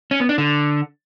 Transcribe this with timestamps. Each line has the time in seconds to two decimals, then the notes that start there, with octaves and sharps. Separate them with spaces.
0.11 C#4
0.20 B3
0.29 D4
0.38 D3